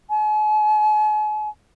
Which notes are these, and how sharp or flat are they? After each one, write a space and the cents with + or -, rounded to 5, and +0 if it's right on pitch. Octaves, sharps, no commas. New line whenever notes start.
G#5 +45